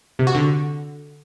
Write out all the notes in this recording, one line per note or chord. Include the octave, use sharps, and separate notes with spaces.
C3
F#4
D3